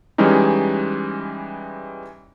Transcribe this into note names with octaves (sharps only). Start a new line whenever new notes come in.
E3 G3 G#3 C#4 D#4